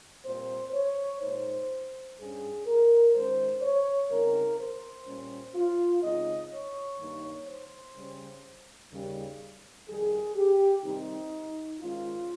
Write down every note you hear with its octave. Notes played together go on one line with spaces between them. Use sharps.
A#2 G3 C4 C5
C#5
A#2 G#3 D#4 C5
G2 G3 C#4 G#4
A#4
G#2 D#3 G#3 C#4 C5
C#5
C#3 G3 C4 D#4 A#4
C5
A#2 G3 C#4
F4
C#3 G#3 C4 D#4 D#5
C#5
G2 D#3 A#3 D#4
C5
C#3 G3 C#4
D#2 C#3 G3
F2 D#3 G3 G#4
G4
C3 D#3 G3 C4 D#4
G#2 D#3 G#3 C#4 F4